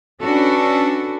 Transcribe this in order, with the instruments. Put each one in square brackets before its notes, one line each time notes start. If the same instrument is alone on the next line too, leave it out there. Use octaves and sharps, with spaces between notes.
[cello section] C#4 D4 F#4 A4 B4